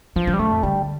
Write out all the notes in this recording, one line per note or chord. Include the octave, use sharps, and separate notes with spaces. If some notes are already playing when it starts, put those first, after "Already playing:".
E3 F3
E3
G3
A2 A3
F2
D3 G3